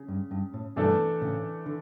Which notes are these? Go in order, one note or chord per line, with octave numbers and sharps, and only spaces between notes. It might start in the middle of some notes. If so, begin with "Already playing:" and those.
Already playing: C#3
G2
G2
A2
G2 B2 E3 A3 D4 A4
A2 C#3
D3